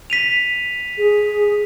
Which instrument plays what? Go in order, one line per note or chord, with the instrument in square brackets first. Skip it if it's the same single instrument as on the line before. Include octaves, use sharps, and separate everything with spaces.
[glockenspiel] B6 D#7 F7
[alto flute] G#4